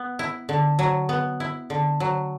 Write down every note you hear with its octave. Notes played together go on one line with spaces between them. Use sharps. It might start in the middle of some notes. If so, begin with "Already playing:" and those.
Already playing: B3
E4
D3
F#3
B3
E4
D3
F#3